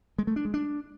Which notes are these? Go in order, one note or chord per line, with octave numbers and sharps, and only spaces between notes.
G#3
A3
D4
G#3
D4